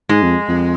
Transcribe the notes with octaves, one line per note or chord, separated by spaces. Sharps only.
G#2 G#3
F2
F2